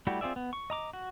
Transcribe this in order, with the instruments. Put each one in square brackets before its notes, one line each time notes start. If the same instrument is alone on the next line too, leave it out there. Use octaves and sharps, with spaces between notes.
[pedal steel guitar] G3 A3 E4 F#4 G4
C4 F4 G#4 D5 E5
B3
C#6
D#5 A#5 D6
F#4